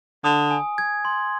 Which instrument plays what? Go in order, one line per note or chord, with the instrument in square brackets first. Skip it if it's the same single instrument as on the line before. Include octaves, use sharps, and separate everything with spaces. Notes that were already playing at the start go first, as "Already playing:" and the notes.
[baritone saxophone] D3 [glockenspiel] D#6
[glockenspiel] G#5
G#6
C6